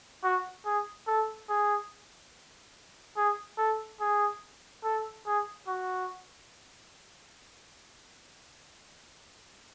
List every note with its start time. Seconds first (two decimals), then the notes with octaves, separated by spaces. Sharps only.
0.24 F#4
0.66 G#4
1.07 A4
1.49 G#4
3.17 G#4
3.58 A4
4.01 G#4
4.84 A4
5.26 G#4
5.68 F#4